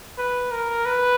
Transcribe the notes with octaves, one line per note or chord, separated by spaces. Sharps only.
B4
A#4
B4